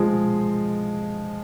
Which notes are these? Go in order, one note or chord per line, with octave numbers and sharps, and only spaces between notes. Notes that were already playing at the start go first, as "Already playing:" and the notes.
Already playing: F3 G#3